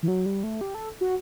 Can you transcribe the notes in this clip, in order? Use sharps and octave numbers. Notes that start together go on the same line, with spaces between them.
E3
F#3
G3
A3
G4
A4
F#4